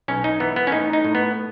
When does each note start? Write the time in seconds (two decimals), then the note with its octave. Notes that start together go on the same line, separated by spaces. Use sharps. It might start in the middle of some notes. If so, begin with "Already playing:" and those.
0.08 B1 C#4
0.24 D#4
0.40 E3 B3
0.56 B3
0.67 C#4
0.72 A2 D#4
0.93 D#4
1.05 A2
1.15 B3